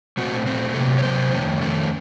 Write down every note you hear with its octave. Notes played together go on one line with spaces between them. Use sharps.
A#2 A3 C4 F#4
A#2 A3 C4
C3 F#3 A#3 A4
C#5
C3 F#3 A#3 C5
F2 D#3 A3 C#4
F2 D#3 A3 C#4